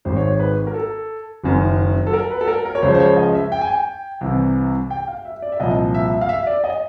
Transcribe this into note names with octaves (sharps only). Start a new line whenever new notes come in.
G#1 G#2 D#3 C5
C#5
C5
B4
A#4
A4
F#1 F#2 D#3
A4
A#4
B4
A4
A#4
A#4
C#5
C#2 C#3 F3 C5
C5
C#5
D#5
E5
G5
G#5
G5
C2 C3 E3
G5
F5
E5
D5
E5
C2 A#2 F3 D#5
E5
F5
E5
D5
D#5